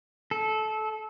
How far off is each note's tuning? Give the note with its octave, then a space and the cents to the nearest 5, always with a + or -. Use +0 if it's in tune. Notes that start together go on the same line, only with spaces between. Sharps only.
A4 -20